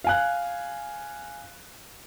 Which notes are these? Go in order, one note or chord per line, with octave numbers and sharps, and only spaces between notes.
F5 G#5 F#6